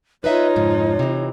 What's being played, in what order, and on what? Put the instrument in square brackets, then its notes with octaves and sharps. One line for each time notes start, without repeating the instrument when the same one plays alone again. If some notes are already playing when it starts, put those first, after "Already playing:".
[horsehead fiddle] D#4 F4 [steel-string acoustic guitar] B4 D#5 E5 [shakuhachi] C#5
[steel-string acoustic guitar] F2 G#2 C#3
C3 E3